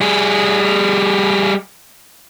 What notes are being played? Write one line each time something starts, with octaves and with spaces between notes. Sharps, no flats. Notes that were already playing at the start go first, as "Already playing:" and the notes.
G3 G#4